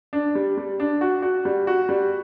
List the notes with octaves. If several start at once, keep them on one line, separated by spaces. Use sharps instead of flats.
D4
G3
G3
D4
F#4
F#4
G3
F#4
G3